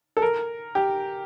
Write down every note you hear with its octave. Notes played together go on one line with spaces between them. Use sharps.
A4
A#4
G4